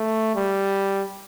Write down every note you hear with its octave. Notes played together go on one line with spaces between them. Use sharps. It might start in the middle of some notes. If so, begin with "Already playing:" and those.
Already playing: A3
G3